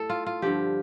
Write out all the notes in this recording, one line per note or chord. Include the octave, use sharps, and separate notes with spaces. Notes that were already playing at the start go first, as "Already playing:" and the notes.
Already playing: A2 A4
F4
F4
G2 D3 F3 G4